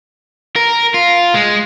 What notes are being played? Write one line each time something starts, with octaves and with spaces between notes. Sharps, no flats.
A#4
F4
G#3